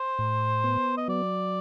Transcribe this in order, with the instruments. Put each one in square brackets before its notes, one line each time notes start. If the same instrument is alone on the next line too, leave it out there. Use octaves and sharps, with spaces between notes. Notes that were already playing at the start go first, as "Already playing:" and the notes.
Already playing: [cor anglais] C5
[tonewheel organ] A2
B3
[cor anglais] D#5
[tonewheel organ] F#3 [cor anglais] D5